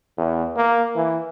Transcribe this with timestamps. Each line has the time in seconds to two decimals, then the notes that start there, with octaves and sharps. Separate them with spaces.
0.18 E2
0.56 A#3
0.96 E3